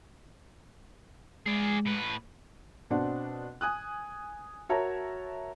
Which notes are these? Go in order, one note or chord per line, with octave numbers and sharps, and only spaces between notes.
G#3 G#4 D5
A2 B4
B2 C4 D4 F#5
G#5 D#6 F#6
F#4 A#4 C#5 E5 A5 A#5